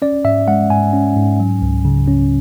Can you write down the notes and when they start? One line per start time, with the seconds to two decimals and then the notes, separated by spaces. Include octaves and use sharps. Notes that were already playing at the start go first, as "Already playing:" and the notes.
0.02 C#4 D5
0.25 G#2 E5
0.48 G#3 F#5
0.70 G#2 G#5
0.93 C#4
1.16 G#2
1.40 F#3
1.62 C#2
1.85 C#3
2.08 C#4